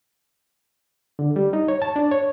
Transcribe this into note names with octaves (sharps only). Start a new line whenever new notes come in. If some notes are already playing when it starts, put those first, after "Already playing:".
D3
G3
D#4
C#5
A5
D4
C#5